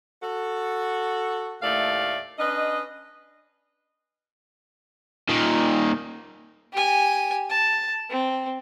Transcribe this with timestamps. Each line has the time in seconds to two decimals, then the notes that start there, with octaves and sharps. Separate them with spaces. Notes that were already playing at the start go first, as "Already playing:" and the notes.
0.22 F#4 A4
1.62 D#2 A2 A3 D5 F5
2.38 C#4 D4 B4 D#5
5.29 A#2 D#3
6.73 G4 G#5
7.49 A5
8.10 C4